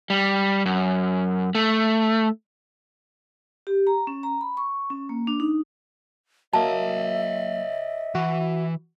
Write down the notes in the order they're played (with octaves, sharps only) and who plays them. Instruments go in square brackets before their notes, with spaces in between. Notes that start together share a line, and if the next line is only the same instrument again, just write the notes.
[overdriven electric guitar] G3
F#2
A3
[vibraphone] G4
A#5
C#4
A#5
B5
C#6
C#4
A#3
D4
D#4
[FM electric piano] F#3 A#3 [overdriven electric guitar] C#5 D#5 [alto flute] E5 [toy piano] A5
[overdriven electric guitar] E3 [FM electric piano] F#4